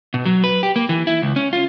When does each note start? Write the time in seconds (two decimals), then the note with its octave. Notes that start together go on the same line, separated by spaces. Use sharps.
0.14 B2
0.25 F#3
0.44 B4
0.63 G4
0.76 A#3
0.89 E3
1.07 E4
1.22 C#2
1.36 C#4
1.53 F4